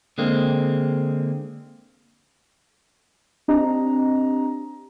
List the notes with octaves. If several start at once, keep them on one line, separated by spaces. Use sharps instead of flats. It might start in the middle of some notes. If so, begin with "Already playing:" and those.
D3 G#3 A#3 C4
C4 D4 G4 D#5 A#5